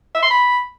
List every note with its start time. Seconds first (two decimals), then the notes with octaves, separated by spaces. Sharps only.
0.15 E5
0.23 C6
0.30 B5